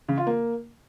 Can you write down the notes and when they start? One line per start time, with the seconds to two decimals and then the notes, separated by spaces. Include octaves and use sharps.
0.08 C#3
0.18 F4
0.27 A#3